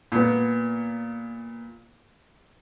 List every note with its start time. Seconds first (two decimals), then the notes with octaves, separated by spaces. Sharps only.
0.12 A#2 B3